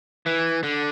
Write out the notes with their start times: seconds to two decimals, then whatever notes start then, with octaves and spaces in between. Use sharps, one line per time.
0.26 E3
0.64 D3